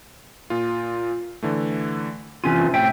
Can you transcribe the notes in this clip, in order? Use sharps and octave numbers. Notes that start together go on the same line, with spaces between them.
A#2 F4
D3 E3 A3
C3 E3 C4 C#4 F4 D#7
A2 E5 G5